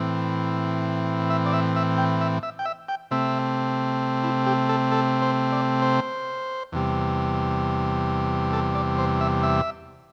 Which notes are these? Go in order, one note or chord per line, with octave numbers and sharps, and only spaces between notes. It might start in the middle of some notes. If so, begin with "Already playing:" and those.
Already playing: A2 E3 C4
E5
D5
E5
E5
G5
E5
E5
G5
E5
G5
C3 A3 C4 E5
E4
G4
A4
A4
C5
D5
C5
E2 C3 G3
A4
D5
C5
E5
E5